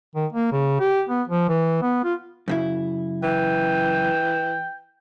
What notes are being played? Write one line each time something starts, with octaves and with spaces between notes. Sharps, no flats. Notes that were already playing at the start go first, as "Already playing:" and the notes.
D#3
A#3
C#3
G4
B3
F3
E3
B3
F4
F#2 C#3 E4
E3 G5